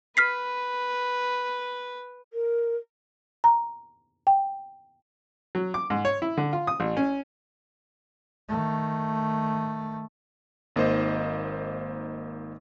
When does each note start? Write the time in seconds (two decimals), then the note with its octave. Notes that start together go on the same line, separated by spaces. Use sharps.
0.17 B4 F6 B6 C7
2.33 A#4
3.44 A#5
4.27 G5
5.55 F#3
5.74 D6
5.90 G#2
6.05 C#5
6.22 E4
6.37 D3
6.53 F4
6.67 D#6
6.80 A1
6.97 C#4
8.49 D#3 A3
10.76 G#1 A#3 D#4 C5 D#5